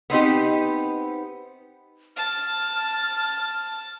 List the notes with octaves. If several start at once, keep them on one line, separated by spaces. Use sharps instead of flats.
B3 C4 D#4 G4
A5 F6